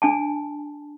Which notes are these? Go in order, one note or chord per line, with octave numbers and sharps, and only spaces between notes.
D4 G#5 A5